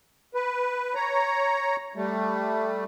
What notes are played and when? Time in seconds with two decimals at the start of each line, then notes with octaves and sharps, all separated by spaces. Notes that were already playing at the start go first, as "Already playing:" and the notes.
0.34 B4
0.95 C#5 A#5
1.96 G3 A3